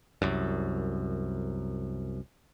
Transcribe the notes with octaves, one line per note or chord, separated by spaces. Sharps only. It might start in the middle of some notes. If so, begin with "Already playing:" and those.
C2 F#2